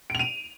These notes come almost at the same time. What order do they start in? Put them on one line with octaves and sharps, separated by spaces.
D7 F7 D#7